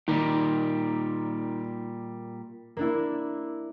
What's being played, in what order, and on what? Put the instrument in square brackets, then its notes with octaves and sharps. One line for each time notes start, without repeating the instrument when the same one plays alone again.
[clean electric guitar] A#2 G3 [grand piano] D#3
[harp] A#3 D4 E4